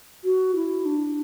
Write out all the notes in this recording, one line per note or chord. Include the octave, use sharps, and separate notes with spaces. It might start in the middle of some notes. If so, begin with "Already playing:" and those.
F#4
E4
D4